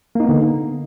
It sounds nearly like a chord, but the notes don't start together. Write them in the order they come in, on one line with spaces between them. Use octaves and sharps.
A#3 D#4 B3 D3